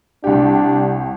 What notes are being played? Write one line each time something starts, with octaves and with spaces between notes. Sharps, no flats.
C2 D4 G4